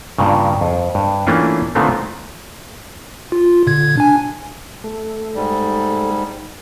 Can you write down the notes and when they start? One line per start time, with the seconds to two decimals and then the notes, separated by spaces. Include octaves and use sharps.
0.18 G2 A#2 C#3
0.61 F2
0.95 G2
1.27 E3 A3 A#3 C#4 D4 F4
1.75 A#2 D3 D#3 A3 B3 C4
3.32 F4
3.67 A#2 D3 G#6
3.97 D4 G#5
4.84 A3
5.36 G#2 G3